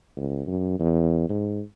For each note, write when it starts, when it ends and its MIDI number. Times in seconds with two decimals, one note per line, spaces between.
0.17 0.42 37
0.47 0.77 42
0.79 1.24 40
1.29 1.61 44